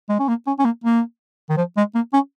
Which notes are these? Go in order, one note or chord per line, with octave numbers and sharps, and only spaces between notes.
G#3
C#4
A#3
C#4
C#4
A#3
A#3
D#3
F3
G#3
A#3
C#4